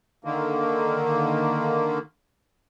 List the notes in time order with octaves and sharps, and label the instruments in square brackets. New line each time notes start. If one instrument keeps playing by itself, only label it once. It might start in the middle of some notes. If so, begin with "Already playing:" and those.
[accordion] D3 D#3 A#3